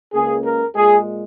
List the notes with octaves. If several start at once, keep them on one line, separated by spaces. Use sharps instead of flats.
C#2 C#3 A#3 G#4
A#4
A#2 G#3 G#4